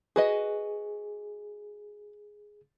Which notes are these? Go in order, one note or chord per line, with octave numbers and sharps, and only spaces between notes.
F#4 G#4 B4 D#5